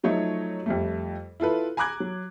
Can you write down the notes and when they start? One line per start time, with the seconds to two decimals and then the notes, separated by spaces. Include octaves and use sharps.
0.03 F3 F#3 A3 D#4 C#5
0.66 F2 G3 A3
1.40 E4 F4 A4 B4
1.77 G#5 A#5 B5 D6 F#6 G#6
2.00 F#3